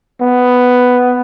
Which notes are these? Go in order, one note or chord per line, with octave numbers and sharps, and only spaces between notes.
B3